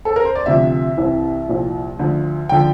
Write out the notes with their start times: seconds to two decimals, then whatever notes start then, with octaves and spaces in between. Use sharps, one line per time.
0.05 A4
0.16 A#4
0.25 C5
0.35 D5
0.46 D2 C3 F3 E5
0.97 C2 C3 E3
1.48 C2 A#2 F3
1.99 D2 D3 F3
2.49 D3 F3 G5